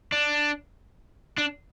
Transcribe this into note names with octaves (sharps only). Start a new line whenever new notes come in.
D4
D4